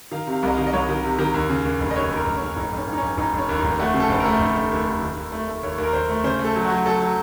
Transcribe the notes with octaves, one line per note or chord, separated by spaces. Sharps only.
D#3 F5
C3
F5
C2 D#5
F5
D#3
D#5
C2 C#5
D#3
C3
D#3
D#2
C#3
D#2
F1
D#5
D#2 C#5
D#2 A#4
F1
C#4
F1
F1 D#4
F1 C#4
F1
D#4
F1 C#4
F1 D#4
F1 C#4
D#2
D#4
F1
A3 F#4
C#3
A4
F1 C5
A#4
A3
F1
F1
D#2
D#2
D#3
D#2
A3
A3
D#2 C#5
D#2
A#4
D#2 C5
A3
C#3 C5
A3
A4
F#3
F#4
F#3
F#3 A4
F#3